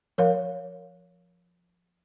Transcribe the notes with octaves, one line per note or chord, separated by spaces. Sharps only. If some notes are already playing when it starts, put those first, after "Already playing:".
F3 A#4 C#5 F5